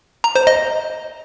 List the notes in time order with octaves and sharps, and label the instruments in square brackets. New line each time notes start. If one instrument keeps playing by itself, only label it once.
[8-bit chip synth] A#5
C5
D#5